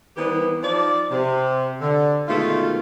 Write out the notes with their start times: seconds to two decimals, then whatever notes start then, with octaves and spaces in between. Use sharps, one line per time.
0.17 D#3 E3 G3 B3 C4 G4
0.62 F3 D#4 D5
1.10 C3
1.81 D3
2.28 B2 D#3 G#3 A3 F4